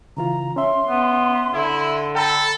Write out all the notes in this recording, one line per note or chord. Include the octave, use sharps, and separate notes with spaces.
C#3 E3 F4 A#5
C#4 E5 C6
B3
D3 E4
A4 G5 A#5 B5